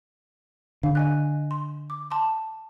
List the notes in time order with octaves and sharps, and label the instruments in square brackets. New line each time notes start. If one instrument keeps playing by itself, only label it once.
[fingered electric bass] D3 [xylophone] F5
[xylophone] D#5 G#5 F#6
C6
D6
A5 C6 D6